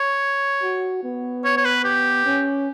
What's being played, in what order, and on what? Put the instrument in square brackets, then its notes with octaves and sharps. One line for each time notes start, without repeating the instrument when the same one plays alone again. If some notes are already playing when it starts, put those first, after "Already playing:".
Already playing: [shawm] C#5
[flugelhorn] F#4
B3
[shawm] C#5
C#5
B4
G4
[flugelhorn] C#4